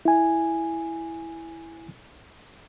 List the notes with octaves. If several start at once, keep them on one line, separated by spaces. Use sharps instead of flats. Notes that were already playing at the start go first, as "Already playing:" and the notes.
E4 G#5